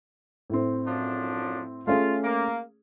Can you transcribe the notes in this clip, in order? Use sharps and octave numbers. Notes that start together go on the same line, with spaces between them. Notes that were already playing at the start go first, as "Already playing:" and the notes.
A2 C4
F#2 F3 D4
A3 C#4 F4 G#4
A#3